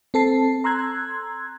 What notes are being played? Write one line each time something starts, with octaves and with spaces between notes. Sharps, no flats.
C4 A4 A5 C7
A#5 C6 E6 F#6 G#6